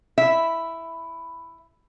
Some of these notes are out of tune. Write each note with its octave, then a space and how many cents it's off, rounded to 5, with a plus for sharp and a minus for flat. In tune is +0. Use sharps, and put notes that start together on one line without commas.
E4 +5 E5 +0